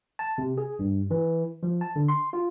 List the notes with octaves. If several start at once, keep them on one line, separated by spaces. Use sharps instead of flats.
A5
C3
G#4
G2
E3
F3
A5
D3
C6
F4